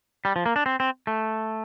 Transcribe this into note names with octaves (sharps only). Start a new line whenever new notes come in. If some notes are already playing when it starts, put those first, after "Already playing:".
G3
F3
A#3
D4
C4
C4
A3